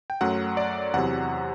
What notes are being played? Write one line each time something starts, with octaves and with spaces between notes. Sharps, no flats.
G5
F#2 F#3 A3 F#5
D5
E2 C3 F#3 F#5